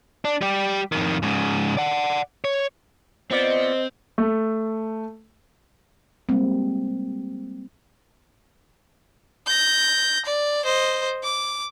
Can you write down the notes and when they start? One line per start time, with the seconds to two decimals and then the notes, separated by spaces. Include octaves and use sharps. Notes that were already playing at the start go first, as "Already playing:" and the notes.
0.25 D4
0.41 G3 G4
0.92 F2 D#3
1.23 G#2 C#3
1.77 D5 F#5
2.44 C#5
3.31 B3 C4 F4 C5 D5 D#5
4.18 A3
6.29 G3 G#3 A#3 C4
9.47 G6 A#6
10.26 D5
10.65 C5 D#5
11.23 D6